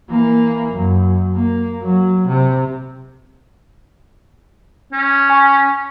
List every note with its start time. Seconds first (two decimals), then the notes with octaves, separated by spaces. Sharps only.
0.10 E3 A#3
0.73 F#2
1.36 A#3
1.82 F#3
2.28 C3
4.93 C#4
5.30 G#5 C#6